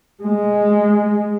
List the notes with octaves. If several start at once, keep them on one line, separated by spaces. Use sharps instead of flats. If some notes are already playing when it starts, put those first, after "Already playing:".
G#3